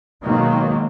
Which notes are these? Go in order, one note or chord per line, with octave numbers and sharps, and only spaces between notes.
B2 D#3 F#3 G#3 A#3